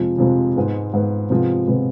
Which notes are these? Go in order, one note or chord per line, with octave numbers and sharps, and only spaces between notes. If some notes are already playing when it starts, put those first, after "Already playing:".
Already playing: F2 C3 F3 G#3
F2 C3 F3 G#3
G#2 G#3 B3
G#2 G#3 B3
C3 F3 G#3 B3
C3 F3 G#3 B3